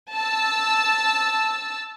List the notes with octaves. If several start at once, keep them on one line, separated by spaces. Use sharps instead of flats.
A5 E6